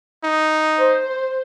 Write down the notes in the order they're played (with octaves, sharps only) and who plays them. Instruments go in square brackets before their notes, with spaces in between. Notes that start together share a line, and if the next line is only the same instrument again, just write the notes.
[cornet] D#4
[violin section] C5